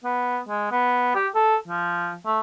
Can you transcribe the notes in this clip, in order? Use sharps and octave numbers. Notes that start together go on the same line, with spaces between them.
B3
G#3
B3
G4
A4
F3
A3